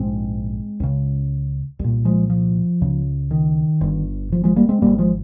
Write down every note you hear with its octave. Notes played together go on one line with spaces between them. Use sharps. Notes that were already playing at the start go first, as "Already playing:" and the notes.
Already playing: A#1 G#2 G#3 C4
C#2 C#3
C2 A#2
F3 G#3
F3
C#2 C#3
D#3
G1 G2
F3
F3 G#3
G3 A#3
G#3 C4
G#1 G2 G3 A#3
F3 G#3